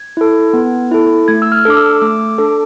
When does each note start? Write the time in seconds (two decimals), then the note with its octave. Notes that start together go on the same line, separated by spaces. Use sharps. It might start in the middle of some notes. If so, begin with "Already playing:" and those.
Already playing: G#6
0.17 E4 A4
0.53 B3
0.92 E4 A4
1.28 A3 G#6
1.42 E6
1.52 F6
1.65 D4 A4 D6
1.77 E6
2.02 A3 D6
2.38 D4 A4